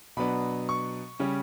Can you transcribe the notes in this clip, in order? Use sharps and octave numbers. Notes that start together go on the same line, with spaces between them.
B2 F#3 B3 D4 B5
C#6
C#3 G3 C#4